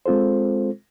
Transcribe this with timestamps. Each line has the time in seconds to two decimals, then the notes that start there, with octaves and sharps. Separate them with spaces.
0.06 G#3 C4 F4 A4 C5